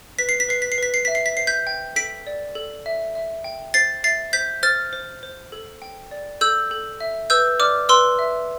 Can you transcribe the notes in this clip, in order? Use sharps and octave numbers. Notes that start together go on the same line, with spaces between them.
B4 B6
C7
B6
B4 C7
B6
C7
B4 B6
C7
E5 B6
C7
B6
C5 C7
G6 B6
G5
A4 B6 D7
D5
A4
E5
E5
G5
C5 A6 C7
E5 A6 C7
C5 G6 B6
C5 F6 A6
C5
C5
A4
G5
D5
A4 E6 G6
A4
E5
B4 E6 G6
D5 D6 F6
B4 C6 E6
E5